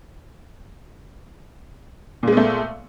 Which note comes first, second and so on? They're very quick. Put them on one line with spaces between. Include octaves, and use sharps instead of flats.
A#2 G#3 B3 A3